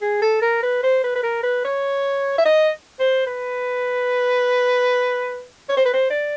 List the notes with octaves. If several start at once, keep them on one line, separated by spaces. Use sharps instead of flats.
G#4
A4
A#4
B4
C5
B4
B4
A#4
B4
C#5
E5
D#5
C5
B4
C#5
C5
B4
C5
D5